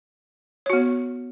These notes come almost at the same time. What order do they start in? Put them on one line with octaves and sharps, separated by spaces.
C#5 F#4 B3